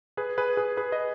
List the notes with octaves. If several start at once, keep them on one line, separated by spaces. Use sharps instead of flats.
G#4 B4
G#4 B4
G#4 B4
G#4 B4
B4 D#5